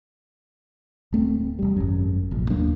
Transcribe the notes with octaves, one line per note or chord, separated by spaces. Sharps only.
D1 A3 C4
E1 G3
G#1 F#2
F1 A#1
D#2 F#3 A#3 D4